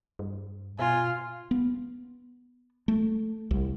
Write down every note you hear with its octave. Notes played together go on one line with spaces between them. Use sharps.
G2
B2 F4 G#5
B3
A3
C2